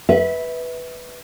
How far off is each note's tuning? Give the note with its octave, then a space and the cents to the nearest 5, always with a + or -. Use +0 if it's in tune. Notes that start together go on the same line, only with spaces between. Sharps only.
B4 +0 E5 -25